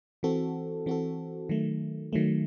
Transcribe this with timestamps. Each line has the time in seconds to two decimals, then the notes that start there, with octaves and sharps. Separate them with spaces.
0.23 E3 C4 F#4 A4
0.86 E3 C4 F#4 A4
1.49 D#3 F#3 A3
2.13 D#3 F#3 A3